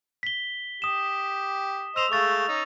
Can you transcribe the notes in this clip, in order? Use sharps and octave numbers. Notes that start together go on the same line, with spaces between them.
B6 G7
G4 D#6 E7
C5 D#5 E6 F7
G#3 A3 F5 C#6 A6
C#4 D#4